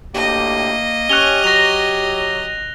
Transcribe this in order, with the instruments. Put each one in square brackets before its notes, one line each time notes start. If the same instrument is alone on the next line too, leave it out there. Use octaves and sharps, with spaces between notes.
[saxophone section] D2 A2 G4 [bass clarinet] A#3 [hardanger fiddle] D#5
[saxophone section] C#4 [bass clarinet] G4 [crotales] F#6 F7 G7
[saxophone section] F#3 [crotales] A#6 F7